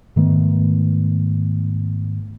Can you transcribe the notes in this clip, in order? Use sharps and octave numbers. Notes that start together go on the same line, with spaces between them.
G#2 D#3 A3 B3